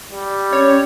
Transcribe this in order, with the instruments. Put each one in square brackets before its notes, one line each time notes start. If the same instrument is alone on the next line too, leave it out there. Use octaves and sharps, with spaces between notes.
[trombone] G3
[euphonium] C#4 [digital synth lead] C#5